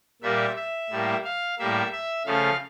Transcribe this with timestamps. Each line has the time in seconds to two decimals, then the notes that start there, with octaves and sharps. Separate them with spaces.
0.22 A#2 G3 A#3 E5
0.56 E5
0.90 A2 G3 A#3
1.24 F5
1.59 A2 G3 A#3 E5
1.92 E5
2.26 C#3 F3 A3 F5